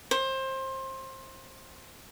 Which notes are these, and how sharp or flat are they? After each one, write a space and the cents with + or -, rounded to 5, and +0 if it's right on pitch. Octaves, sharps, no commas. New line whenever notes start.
C5 +25